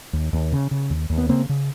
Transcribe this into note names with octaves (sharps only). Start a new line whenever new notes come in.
D#2
D#2
C#3
C#3
D#2
D#2
B3
C#3 A#3 C4
C#3